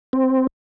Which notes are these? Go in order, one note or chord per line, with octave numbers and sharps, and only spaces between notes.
C4